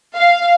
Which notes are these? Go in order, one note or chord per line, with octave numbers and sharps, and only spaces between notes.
F5